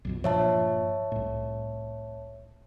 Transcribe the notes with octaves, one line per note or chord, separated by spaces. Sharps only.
B1 F2 B2
G2 A#2 F3 C#5 E5 A5
C2 A2